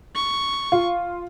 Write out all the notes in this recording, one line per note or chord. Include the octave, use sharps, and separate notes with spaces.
C#6
F4